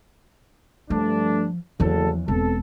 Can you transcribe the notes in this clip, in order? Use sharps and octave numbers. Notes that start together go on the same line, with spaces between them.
G2 F3 A3 D4
F#1 E2 F3 A4
E1 B3 C4 A4